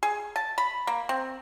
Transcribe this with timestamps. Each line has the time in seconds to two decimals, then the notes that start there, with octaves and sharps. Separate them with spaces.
0.03 G#4
0.36 A5
0.58 B5
0.87 A#3
1.09 C4